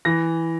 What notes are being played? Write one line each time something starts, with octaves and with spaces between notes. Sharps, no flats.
E3 A#6